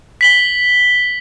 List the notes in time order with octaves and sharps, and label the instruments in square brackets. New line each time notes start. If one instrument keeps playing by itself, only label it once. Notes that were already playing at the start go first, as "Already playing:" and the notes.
[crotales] B6 F#7 G7